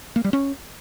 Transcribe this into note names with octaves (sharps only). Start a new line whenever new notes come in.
A#3
G3
C#4